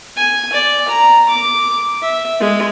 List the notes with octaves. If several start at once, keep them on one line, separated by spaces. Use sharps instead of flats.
G#5
D5
A#5
D6
E5
G#3